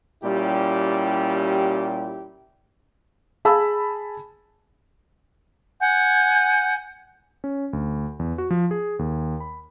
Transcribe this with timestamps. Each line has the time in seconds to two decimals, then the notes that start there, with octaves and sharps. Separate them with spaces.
0.23 A#2 G3 C#4 E4 G4
3.45 G#4 G#5 A5 B5 E6
5.81 F#5 G#5 G6
7.44 C#4
7.73 D2
8.19 E2
8.38 F#4
8.50 F3
8.71 G#4
8.99 D#2
9.40 B5